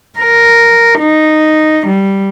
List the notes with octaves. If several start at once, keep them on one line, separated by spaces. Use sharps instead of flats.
A#4
D#4
G3